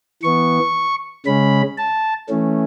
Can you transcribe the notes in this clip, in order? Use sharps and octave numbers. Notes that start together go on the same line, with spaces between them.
E3 B3 C#6
C#3 G#3 C#4 B5
A5
E3 A3 C#4